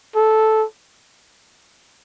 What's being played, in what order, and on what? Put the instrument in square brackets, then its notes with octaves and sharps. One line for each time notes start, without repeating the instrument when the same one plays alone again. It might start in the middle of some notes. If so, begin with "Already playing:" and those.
[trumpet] A4